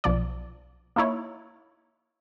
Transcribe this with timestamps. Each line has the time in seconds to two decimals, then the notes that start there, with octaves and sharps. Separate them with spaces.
0.04 B1 F3 D5
0.96 A#3 D#4 E4 C#5